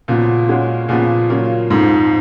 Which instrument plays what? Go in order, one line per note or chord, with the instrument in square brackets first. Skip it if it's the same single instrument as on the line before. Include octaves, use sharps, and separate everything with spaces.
[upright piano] C#2 C#3 F3 B3 F#4 [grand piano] A#2
[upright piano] C#3 G#3 C#4 F#4
[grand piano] A#2 [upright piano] C#3 F3 B3 F4 G#4
[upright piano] C#3 F#3 A#3 F4
[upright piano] F2 C#3 F3 [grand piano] G#2